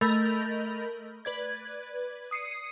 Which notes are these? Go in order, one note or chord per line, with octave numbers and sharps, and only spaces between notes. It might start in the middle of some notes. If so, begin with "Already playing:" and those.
A3 A#4 D#5 B5 G6 F7
B4 D5 G#6
D#6 C7 C#7 D#7